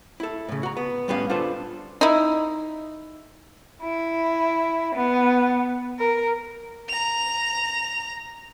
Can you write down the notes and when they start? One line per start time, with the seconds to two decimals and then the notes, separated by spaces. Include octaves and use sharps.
0.20 E4 A4
0.49 A2 C#3
0.63 F#4 A#5
0.77 B3
1.08 A2 G3 B3 C#4 B4 F5
1.30 D4 F4 A4 B4 C5
2.01 D#4 E4
3.81 E4
4.94 B3
5.99 A#4
6.89 A#5 F7